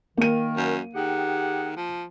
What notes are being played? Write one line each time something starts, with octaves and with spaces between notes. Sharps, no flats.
D#3 A#3 D#7
F#2
D#3 G4 G#4 F#5
F3